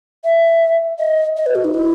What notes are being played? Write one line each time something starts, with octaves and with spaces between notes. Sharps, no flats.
E5
D#5
D#5
B4
F#4
D#4
E4